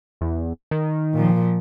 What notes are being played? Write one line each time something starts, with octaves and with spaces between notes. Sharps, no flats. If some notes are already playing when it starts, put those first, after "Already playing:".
E2
D#3
A#2 F3